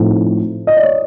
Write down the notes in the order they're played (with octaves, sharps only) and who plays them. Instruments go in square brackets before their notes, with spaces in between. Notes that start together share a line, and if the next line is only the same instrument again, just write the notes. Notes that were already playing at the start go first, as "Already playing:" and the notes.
Already playing: [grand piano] A2 F3 A3 C4 D#4
D#5
D5
C#5